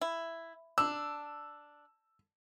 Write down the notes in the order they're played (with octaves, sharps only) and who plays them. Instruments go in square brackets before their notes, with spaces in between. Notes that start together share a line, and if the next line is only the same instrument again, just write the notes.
[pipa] E4
[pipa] D4 [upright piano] E6